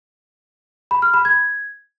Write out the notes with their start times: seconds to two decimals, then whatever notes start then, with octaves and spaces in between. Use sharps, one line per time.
0.91 B5
1.02 F6
1.14 B5
1.25 G#6